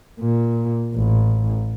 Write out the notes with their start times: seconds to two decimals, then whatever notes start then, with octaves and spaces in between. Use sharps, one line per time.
0.20 A#2
0.95 A1